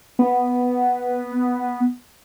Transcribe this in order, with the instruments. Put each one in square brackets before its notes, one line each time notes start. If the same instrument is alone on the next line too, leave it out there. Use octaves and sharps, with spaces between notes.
[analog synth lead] B3